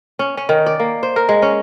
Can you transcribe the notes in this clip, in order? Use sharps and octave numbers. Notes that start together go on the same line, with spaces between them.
C#4
C#4
D#3
D5
A#3
C5
A#4
G#3
C#4